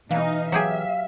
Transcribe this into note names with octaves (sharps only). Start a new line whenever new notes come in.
B2 E3 D#4 F5
F#3 G4 G#4 E5